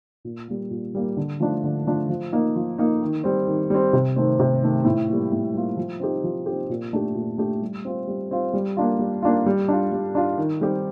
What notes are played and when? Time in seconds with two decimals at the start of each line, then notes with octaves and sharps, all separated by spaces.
0.25 A#2
0.48 G3 A#3
0.71 A#2
0.95 G3 A#3
1.17 D3
1.40 F3 A3 D4 F4
1.64 D3
1.87 F3 A3 D4 F4
2.09 F3
2.32 A#3 D#4
2.55 F3
2.78 A#3 D#4
3.02 D#3
3.24 G3 C4
3.47 D#3
3.70 G3 C4
3.93 C3
4.16 D#3 A3 C4
4.39 C3
4.63 D#3 A3 C4
4.85 A2
5.08 G3 A#3 F4
5.32 A2
5.54 G3 A#3 F4
5.77 F3
6.00 C4 D#4 G4
6.24 F3
6.46 C4 D#4 G4
6.69 A#2
6.93 A3 D4 G4
7.15 A#2
7.38 A3 D4 G4
7.62 G3
7.85 C4 F4
8.07 G3
8.31 C4 F4
8.53 G3
8.77 A#3 D4 F4
8.99 G3
9.22 A#3 D4 F4
9.46 G3
9.68 D4 F4
9.92 G3
10.15 D4 F4
10.38 D#3
10.61 G3 C4 G4